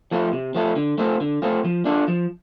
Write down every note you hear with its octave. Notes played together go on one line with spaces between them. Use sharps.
F3 A3 F4 A4
C3
F3 A3 F4 A4
D3
A3 C4 F4 A4
D3
A3 C4 F4 A4
F3
D4 F4 A4
F3